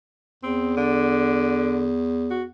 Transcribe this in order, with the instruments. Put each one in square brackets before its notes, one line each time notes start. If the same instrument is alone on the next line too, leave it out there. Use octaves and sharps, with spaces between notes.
[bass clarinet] E2 [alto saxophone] C4
[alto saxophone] D3
F#4